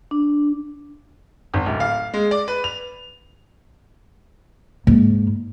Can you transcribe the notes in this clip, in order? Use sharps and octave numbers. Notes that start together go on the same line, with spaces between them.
D4
G#1
D1
F5
G#3
D5
B4
F7
G#2 A#3